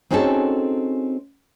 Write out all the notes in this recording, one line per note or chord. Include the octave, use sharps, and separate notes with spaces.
C4 C#4 D#4 F#4 G#4 A4